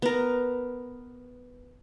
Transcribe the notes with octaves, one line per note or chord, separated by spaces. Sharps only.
B3 A#4